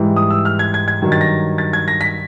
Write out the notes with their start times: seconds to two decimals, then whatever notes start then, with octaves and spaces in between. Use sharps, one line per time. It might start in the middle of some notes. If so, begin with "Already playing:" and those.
Already playing: G#2 E3 G3
0.16 D#6
0.30 E6
0.45 F6
0.59 G#6
0.74 G#6
0.88 G#6
1.02 G2 D#3 F#3
1.12 A6
1.21 A#6
1.58 A6
1.73 G#6
1.88 A#6
2.01 B6